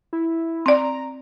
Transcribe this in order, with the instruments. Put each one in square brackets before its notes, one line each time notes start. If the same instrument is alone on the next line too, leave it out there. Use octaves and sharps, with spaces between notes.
[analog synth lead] E4
[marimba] C4 D5 [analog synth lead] A#5